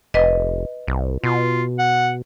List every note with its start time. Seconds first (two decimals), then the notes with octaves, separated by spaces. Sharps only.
0.14 F1 B4 D#5
0.87 C2
1.24 B2 F4
1.79 F#5